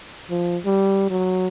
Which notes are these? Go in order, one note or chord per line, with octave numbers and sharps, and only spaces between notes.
F3
G3
F#3